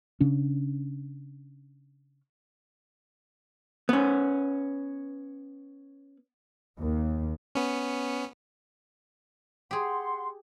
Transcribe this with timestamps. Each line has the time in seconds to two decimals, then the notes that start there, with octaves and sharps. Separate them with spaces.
0.20 C#3 C#4 D4
3.89 B3 C#4
6.79 D#2
7.55 B3 C#4
9.71 G4 G#4 F#5 C6